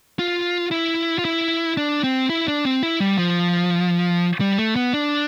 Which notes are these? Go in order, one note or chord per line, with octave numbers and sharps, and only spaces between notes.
F4
E4
F4
E4
D4
C4
E4
D4
C4
E4
G3
F3
G3
A3
B3
D4